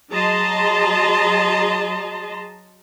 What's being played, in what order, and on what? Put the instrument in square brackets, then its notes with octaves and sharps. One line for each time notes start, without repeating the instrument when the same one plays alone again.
[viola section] F#3 G#4 D#5 A5 A#5 C6